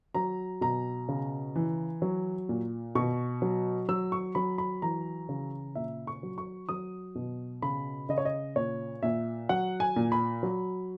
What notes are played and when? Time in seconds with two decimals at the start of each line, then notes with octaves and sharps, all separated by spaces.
0.15 F#3 A#5
0.61 B2 A#5
1.08 C#3
1.56 E3
2.02 F#3
2.49 A#2
2.95 B2 C#6
3.42 F#3
3.89 F#3 E6
4.12 C#6
4.35 F#3 B5
4.58 B5
4.82 E3 A#5
5.29 C#3
5.75 A#2 E5
6.07 C#6
6.23 F#3
6.38 C#6
6.69 F#3 D#6
7.15 B2
7.62 C#3 B5
8.09 C#3 D#5
8.18 C#5
8.25 D#5
8.56 A#2 C#5
9.03 A#2 E5
9.49 F#3 F#5
9.80 G#5
9.96 A#2
10.12 B5
10.43 F#3